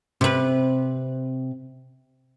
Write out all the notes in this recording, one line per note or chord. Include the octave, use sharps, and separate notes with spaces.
C3 B4